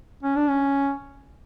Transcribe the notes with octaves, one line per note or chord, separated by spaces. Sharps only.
C#4
D4
C#4